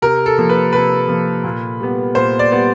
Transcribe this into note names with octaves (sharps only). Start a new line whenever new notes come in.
C3 A#4
A4
F3 A#3
B4
C3 B4
F3 A#3
A#2
G3 B3
A#2 C5
D5
G3 B3